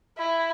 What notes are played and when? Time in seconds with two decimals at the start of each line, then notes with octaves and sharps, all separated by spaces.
0.18 E4